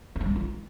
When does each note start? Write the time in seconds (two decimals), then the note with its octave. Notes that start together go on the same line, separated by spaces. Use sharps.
0.16 C#4
0.21 D4
0.26 G3
0.31 D4
0.36 F4